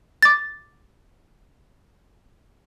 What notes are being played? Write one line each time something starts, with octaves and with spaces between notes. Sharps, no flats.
D6 A6